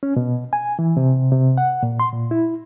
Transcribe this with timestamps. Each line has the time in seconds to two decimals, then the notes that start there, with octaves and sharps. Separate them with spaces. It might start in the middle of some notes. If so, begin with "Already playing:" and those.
0.03 C#4
0.16 B2
0.53 G#5
0.79 E3
0.97 C3
1.32 C3
1.58 F#5
1.83 A#2
2.00 C6
2.13 A#2
2.31 E4